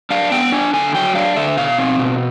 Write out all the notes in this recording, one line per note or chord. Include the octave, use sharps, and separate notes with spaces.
D4 F5
B3 G5
D4 G#5
D3 G#5
F#3 G5
D4 F5
D3 E5
B2 F5
C4
B2